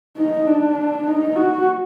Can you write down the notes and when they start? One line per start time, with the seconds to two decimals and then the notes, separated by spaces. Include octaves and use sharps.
0.18 D#4
0.47 D4
1.07 D#4
1.36 F#4